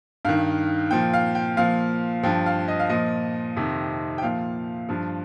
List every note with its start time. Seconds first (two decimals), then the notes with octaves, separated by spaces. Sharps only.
0.25 G2 D#3 F5
0.91 A#2 F3 G5
1.14 F5
1.35 G5
1.57 A#2 F3 F5
2.23 G2 F3 G5
2.46 F5
2.68 D#5
2.80 F5
2.89 A#2 F3 D#5
3.56 F2 C3 D#3
4.18 G5
4.22 A#2 F3 F5
4.89 G2 F3